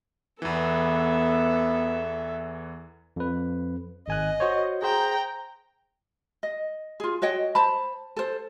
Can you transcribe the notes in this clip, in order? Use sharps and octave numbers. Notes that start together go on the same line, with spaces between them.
E2 E3 B3 A4 E5
F2 B4
G#1 D#5 G#5 F#6
F#4 C5 C#5
G#4 C5 G5 A#5
D#5
F4 G#4
F#4 C#5 D#5 G5
C5 A5 B5
A4 C5